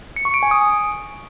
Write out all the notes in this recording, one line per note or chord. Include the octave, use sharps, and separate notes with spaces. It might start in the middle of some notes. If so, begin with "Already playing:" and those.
C#7
C#6
D7
G#5
D#6